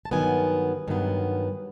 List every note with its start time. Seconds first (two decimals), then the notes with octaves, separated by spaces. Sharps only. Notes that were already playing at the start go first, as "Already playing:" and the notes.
0.05 A5
0.11 G2 D#3 F#3 B3 G#5
0.88 G2 D#3 F#3 B3